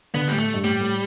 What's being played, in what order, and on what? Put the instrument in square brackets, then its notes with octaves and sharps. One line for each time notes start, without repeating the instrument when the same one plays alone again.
[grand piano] D3 [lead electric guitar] B3
[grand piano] A2 [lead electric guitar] G3
[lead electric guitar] A3
[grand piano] G2
[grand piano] A2 [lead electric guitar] G3
[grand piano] A2